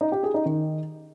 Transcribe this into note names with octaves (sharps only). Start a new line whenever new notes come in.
D#4
G4
G#4
D#4
D#3